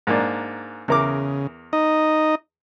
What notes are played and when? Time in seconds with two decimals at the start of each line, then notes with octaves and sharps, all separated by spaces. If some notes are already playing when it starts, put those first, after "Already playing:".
0.07 G#2 A#3 D4
0.88 E2 C#3 A#4 D6
1.73 D#4 D#5